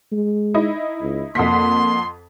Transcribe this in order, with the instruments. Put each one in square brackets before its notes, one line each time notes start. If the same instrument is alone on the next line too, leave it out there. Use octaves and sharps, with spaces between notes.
[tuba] G#3
[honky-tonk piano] D#4 E4 D#5
[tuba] C#2
[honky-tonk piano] F2 F#5 B6 [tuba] A#3 [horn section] C6